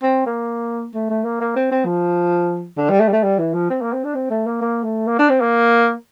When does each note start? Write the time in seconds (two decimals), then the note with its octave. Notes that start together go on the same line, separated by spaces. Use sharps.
0.03 C4
0.26 A#3
0.94 A3
1.10 A3
1.24 A#3
1.41 A#3
1.56 C4
1.71 C4
1.85 F3
2.77 D3
2.90 G3
3.00 A3
3.08 G3
3.12 A3
3.23 G3
3.39 E3
3.54 F3
3.70 C4
3.82 A#3
3.93 C4
4.04 D4
4.15 C4
4.30 A3
4.46 A#3
4.61 A#3
4.84 A3
5.07 A#3
5.19 D4
5.30 C4
5.41 A#3